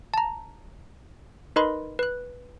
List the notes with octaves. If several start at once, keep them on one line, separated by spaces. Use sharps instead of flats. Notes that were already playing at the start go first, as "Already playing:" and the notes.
A5 A#5
D#4 A#4 B4 D#5 B5 C6
B4 F#6